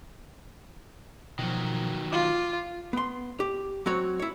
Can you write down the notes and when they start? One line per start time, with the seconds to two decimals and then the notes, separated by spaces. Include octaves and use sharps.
1.39 B2 D#3 F3 F#3
2.12 F4 D6
2.93 B3 C6
3.40 G4
3.86 F#3 C4 F#4 C#5
4.20 E4 C#5